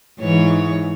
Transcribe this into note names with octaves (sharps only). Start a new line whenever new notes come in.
G#2 E3 C#5